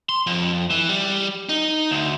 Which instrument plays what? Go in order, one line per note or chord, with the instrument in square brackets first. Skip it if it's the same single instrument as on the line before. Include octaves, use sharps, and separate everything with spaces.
[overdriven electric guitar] C6
F2
E3
G3
D#4
D2